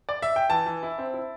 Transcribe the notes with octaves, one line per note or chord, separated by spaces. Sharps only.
D5
E5
G5
E3 A5
E3
E4
C4
E4